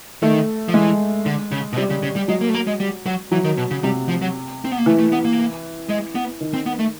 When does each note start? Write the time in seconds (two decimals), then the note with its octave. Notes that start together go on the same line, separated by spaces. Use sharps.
0.22 D#3 A3
0.69 F3
0.74 E3 G#3
1.26 D3
1.51 C#3
1.73 B2
1.77 C3 G3
1.90 C#3
2.03 C#3
2.16 G3
2.28 F#3 G#3
2.41 A#3
2.49 A3
2.54 A#3
2.67 G#3
2.80 G3
3.06 F#3
3.31 E3 F#3
3.44 D#3
3.57 B2
3.71 C#3
3.83 C3 G3
4.09 F3
4.22 F#3
4.65 C4
4.71 B3
4.78 A#3
4.86 E3 A3
4.99 A3
5.12 B3
5.25 A#3
5.89 G#3
6.15 B3
6.41 D#3
6.54 C4
6.66 B3
6.79 A3